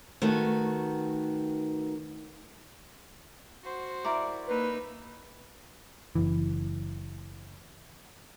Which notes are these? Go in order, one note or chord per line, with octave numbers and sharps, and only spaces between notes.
D#3 A3 F#4 B4
F#4 C5
E4 A#4 D5
A#3 D#4 B4 E6
F#1 E3